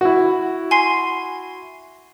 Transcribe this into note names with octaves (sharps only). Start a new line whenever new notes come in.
E4 F#4
G#5 C6 C7